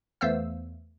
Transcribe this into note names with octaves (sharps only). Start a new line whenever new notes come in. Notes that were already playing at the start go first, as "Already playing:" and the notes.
E2 E3 A3 C5 F5 E6